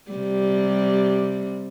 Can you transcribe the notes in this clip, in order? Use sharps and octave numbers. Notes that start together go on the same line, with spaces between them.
C3 G3